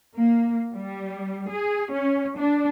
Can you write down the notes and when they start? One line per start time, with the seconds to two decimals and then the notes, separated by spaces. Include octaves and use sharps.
0.16 A#3
0.74 G3
1.51 G#4
1.92 C#4
2.37 D4